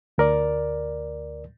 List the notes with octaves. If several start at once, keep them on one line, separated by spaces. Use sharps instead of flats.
D2 A#4 D5